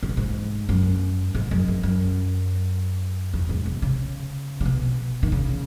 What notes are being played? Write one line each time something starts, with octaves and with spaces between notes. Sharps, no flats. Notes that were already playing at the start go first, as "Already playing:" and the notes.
G#2
F#2
G#2
F#2
G#2
F#2
E2
F#2
E2
G#2
B2
C#3
C#3
B2
D#3
C#3